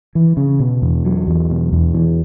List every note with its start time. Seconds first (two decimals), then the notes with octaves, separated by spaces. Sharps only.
0.15 E3
0.37 C#3
0.60 B2
0.82 E2
1.05 F#3
1.27 E2
1.50 B2
1.73 E2
1.94 E3